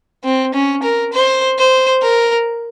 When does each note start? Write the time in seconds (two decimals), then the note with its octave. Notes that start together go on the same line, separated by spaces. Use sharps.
0.24 C4
0.54 C#4
0.83 A#4
1.13 C5
1.58 C5
2.02 A#4